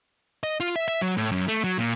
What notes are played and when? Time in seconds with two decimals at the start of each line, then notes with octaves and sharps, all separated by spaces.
0.43 D#5
0.60 F4
0.76 E5
0.88 E5
1.02 F#3
1.17 A2
1.32 F#2
1.48 A3
1.64 F#3
1.79 A#2